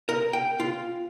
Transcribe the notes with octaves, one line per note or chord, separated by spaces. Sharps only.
A#4
G5
F4